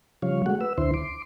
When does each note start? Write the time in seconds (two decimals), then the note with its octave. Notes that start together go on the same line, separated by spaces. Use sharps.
0.22 C#3 F3 G3 C#5 F5
0.46 G#3 A3 F#4 F#5
0.61 B4 E6
0.78 D2 D3 E4 C5 C6
0.94 C6 D6